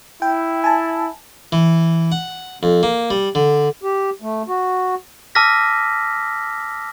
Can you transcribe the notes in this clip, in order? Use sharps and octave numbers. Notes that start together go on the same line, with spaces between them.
E4 G5
G#5 A5
E3
F#5
F2
A#3
G3
D3
G4
A3
F#4
A5 D6 E6 F6 A#6 B6